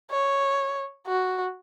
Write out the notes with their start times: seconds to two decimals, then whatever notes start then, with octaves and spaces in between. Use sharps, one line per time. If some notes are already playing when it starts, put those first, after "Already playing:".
0.11 C#5
1.08 F#4